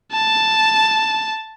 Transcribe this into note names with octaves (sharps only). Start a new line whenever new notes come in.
A5